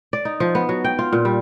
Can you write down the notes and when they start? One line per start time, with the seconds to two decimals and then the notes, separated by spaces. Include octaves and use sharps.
0.13 D5
0.25 D#4
0.40 F3
0.55 B3
0.69 F#3
0.84 G5
0.99 F4
1.13 A#2
1.25 G3